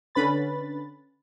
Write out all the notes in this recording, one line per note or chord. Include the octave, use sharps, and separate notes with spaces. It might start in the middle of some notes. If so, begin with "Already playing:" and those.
D3 C#4 B4 B5 A6